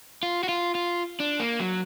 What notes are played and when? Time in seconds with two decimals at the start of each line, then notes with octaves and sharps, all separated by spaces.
0.23 F4
0.43 F#4
0.49 F4
0.75 F4
1.20 D4
1.40 A#3
1.60 F#3